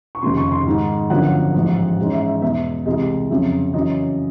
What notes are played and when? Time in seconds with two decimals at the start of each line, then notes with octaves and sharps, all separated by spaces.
0.15 C#6
0.22 F1 D#2 C#3 C6
0.37 C#6
0.52 C6
0.66 G#2 D#3 G#3
1.10 G1 F#2 D3 F3 A#3 F#5
1.54 A1 G#2 F3
1.98 G#2 E3 G#3 C#4
2.13 E5
2.27 E5
2.42 E2 B2 G#3 E5
2.86 C2 C3 E3 G#3 D#5
3.30 F2 C#3 F#3 E5
3.74 F#2 C#3 E3 D#5